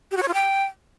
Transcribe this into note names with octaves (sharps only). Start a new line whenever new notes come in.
G4
F#4
C#5
F4
G5